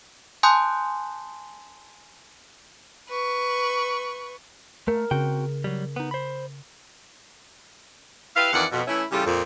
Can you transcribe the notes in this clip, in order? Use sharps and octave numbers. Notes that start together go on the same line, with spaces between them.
G#5 A5 C6 D#6 F#6 G6
B4 C#6
A3 A#4
C#3 C4 F#4 G5
F#3 G3
B3 D#4
C5 B5
E4 G4 B4 F5
F2 D#3 E3 D5 F#5
F2 B2
E3 A3 C#4 E4
C#3 E3 G3 F4 G4 A4
F2 A#2